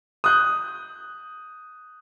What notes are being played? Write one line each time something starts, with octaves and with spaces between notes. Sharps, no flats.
D#6 F#6 G6